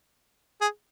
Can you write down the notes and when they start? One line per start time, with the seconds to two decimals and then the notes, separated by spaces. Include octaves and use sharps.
0.61 G#4